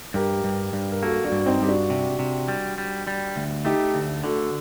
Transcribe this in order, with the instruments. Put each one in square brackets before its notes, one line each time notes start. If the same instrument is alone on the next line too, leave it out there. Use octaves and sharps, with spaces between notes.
[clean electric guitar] G2 [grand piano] G4 A#4
[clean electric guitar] G2
G2
[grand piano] A#4
[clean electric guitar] A#3 [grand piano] F#4 A4
[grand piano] D4 F#4
[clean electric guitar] G2
[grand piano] C4 D#4
[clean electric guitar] G2 [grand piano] G4
[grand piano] D4 F#4
[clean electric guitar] C3
C3
G3
G3
G3
D2
[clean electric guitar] A3 [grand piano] D#4 G4
[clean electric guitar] D2
[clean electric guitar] D3 [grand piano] F#4 A4